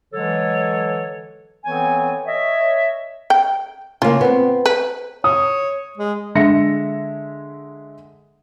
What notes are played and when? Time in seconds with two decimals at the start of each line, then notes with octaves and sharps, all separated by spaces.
0.13 D3 E3 F#3 G#3 A4 C#5
1.65 E3 B3 C4 A4 C#5 G#5
2.26 C#5 D#5 E5
3.30 G5
4.02 C#3 A#3 F4
4.21 B3 C4
4.66 B4
5.24 C#5 D#6
5.98 G#3
6.35 D3 G#3 E5 A#6 C#7